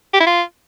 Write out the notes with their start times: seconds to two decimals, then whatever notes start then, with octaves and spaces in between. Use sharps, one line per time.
0.14 G4
0.20 E4
0.27 F4